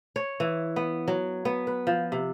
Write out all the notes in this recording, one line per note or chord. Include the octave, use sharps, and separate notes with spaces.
C#5
E3
B3
F#3
B3
B4
F3
C3